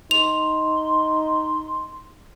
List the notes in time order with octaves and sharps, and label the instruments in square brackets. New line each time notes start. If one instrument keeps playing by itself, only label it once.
[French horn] D#4 [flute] C6 [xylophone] F7